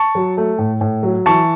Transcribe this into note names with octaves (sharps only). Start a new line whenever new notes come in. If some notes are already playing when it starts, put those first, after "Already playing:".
Already playing: A5 C#6
F#3
A3
A2
A2
F#3
E3 A5 C#6